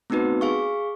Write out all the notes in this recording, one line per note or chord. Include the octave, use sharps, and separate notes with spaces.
A3 B3 C4 D#4 F#4 B4
G#4 F5 C#6